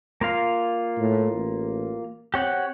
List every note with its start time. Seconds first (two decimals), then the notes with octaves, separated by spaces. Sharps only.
0.21 A#3 F4 F5
0.98 A2
1.32 A1
2.34 C4 G4 C#5 F#5